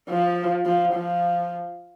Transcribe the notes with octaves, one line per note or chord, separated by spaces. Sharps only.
F3
F3
F3